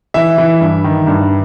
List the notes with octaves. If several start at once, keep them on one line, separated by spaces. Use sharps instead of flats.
E3 E5
E3
G2
D#3
G2